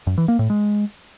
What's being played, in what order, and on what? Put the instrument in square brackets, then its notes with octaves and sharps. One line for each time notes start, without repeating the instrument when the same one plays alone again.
[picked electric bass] F#2
E3
A#3
A2
G#3